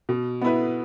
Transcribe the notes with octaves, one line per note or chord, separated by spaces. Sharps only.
B2
B3 E4 B4